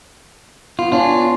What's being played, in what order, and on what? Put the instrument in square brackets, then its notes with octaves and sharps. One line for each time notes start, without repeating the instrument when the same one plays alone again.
[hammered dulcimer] B3 [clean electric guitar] F4
[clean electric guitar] D4 F4 [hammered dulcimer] C#5 G#5